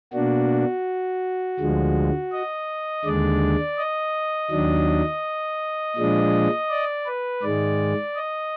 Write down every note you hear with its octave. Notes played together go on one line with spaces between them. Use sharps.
B2 A#3 D4 F#4
D2 D3 F3 G#3
D#5
D#2 D3 G#3 D4 D5
D#5
D#2 D#3 F#3 D4
A#2 F3 G#3 D4
D5
B4
G#2 D#3 G#3 D5
D#5